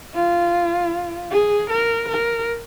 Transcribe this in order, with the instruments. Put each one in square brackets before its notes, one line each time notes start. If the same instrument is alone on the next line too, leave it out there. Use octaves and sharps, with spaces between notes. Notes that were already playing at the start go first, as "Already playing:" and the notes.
[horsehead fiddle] F4
G#4
A#4
A#4